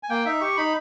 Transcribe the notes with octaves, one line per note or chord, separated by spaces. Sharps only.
G#5
A#3 G5
D#4 E5
G4 C#6
D#4 B5